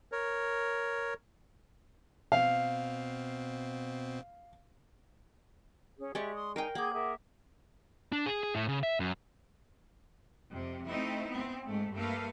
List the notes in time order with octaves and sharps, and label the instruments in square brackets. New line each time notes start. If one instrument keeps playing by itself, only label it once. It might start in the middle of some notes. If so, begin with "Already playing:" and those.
[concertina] A#4 C#5
[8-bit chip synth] B2 C4 [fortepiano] F5
[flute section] C#4 G#4
[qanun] G#3 D5 C#6 [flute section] G4 E5
[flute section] C6 D#6
[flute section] D#4 G#5 [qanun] A#4 F5 G5
[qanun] A#3 [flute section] G#4 G5 G#6 [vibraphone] F#5 D6
[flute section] G#4 A#4 E5
[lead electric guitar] D4
G#4
G#4
A2
C#3
E5
F#2
[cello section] F2 C3
A3 C4 D#4 E4
B3 C4
G#2 A3
G2 A3 A#3 B4 F5